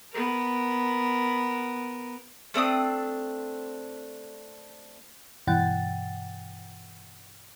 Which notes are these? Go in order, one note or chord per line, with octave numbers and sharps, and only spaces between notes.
B3 A#4
A3 C4 D4 D#6
G2 B2 E3 F#5 G5 A6